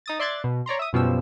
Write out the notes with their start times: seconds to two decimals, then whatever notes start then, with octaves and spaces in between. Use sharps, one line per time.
0.06 D#4 D#6 A6
0.19 D5 E5 C6 F#6 G#6 A6
0.44 B2
0.66 C#5 D5 A#5 C6
0.79 E5 D#6
0.93 F#2 B2 F3 G3 E6